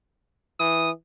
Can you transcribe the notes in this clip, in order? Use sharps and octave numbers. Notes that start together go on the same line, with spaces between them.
E3 D#6